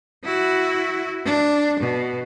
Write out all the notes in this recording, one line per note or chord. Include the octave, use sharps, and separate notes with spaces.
E4 F#4
D4
B2